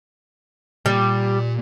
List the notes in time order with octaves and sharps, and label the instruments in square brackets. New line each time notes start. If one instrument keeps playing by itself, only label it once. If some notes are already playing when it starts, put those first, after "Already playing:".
[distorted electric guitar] A#2 [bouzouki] G3